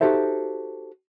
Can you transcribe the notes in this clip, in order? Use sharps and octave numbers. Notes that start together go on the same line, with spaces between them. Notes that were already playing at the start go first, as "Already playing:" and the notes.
D#4 F#4 G4 A4 C5 E5